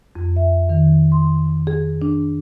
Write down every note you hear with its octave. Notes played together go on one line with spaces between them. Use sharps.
F2
E5
D#3
C6
G#4
D4